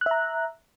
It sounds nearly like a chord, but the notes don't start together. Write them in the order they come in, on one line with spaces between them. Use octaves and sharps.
F#6 E5 A#5